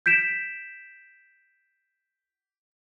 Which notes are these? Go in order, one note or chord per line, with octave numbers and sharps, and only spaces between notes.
G6 B6 D7 E7